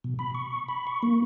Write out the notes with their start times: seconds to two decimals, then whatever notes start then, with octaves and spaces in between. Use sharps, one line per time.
0.04 B2
0.19 B5
0.35 C#6
0.69 B5
0.87 C#6
1.03 A#3